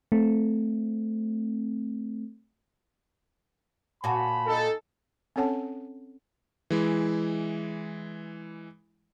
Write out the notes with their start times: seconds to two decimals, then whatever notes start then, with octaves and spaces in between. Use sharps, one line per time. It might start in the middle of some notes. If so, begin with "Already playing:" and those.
0.12 A3 C4
4.04 A#2 F#4 G#5 A5 B5
4.46 D#4 A4
5.36 C4 C#4 A4 C#5 F#5 A5
6.70 E3 G#3 E4